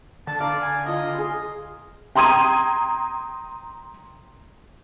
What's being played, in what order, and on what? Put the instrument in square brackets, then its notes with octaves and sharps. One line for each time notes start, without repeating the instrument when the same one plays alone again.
[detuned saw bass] D3 [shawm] A5
[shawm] D5 [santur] F5 A#5
[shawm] G#5
[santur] F4 C6 [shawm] D#5
[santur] G#4 C6
[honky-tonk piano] G5 A#5 C6 D#6 G#6 D#7